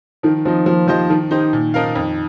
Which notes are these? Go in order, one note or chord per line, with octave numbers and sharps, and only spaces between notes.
D#3 F3
F3 C4 D#4
F3 A#3
F3 G4 C5 D#5
D#3 F3
D#3 D#4 G4 C5
A#2
F3 D#4 A#4 F5
F2